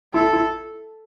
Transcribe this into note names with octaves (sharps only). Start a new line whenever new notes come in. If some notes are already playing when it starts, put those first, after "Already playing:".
E4 A4
E4